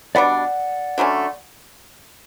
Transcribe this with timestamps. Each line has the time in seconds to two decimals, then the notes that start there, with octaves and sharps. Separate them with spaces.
0.15 B2 G3 D4 D5 F#5
0.98 D3 F#3 A3 C#4